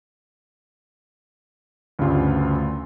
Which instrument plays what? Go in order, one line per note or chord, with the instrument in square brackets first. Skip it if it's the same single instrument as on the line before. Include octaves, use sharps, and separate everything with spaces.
[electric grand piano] D2 G2 C#3 G3 F4